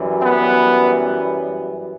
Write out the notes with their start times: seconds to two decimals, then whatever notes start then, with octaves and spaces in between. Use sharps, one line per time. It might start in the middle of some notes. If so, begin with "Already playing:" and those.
Already playing: F#2 E3 G3
0.23 B3